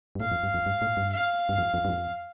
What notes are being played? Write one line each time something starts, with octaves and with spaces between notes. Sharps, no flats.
G2
A2 F5
F2
G2
F2
G2
A2
G2
F5
G2
F2
F2
G2
F2